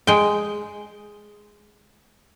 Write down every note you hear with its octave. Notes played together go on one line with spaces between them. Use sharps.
G#3 G5